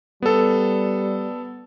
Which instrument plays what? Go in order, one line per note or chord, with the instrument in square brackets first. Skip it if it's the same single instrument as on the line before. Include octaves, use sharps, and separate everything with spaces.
[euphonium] G3 [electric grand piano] B3 A4